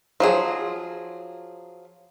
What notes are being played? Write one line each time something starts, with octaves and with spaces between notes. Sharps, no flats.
F3 F#3 G#4